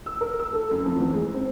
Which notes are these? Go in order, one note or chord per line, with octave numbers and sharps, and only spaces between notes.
E6
A#4
E6
A4
F#2
F2
E2
G#3
C4